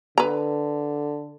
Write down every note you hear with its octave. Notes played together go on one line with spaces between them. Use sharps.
D3 B4 A#5